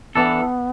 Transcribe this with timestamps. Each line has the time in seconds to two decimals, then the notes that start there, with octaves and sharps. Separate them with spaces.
0.15 E3 B3 D4 A4